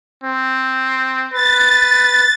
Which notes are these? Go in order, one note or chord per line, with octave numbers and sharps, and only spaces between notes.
C4
B4 A6